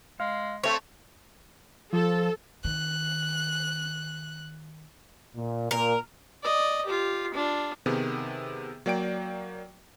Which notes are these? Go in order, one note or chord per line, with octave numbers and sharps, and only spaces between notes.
G#3 F5
A3 C4 C#5
F3 A4
D#3 F#6
A#2
A#2 A#4
D5 D#5
F4 G4
D4 F4
C3 D#3 B3 G#4
F#3 A#3 D5 G5 D7